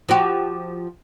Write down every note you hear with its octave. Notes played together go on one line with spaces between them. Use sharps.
F3 F#4 G4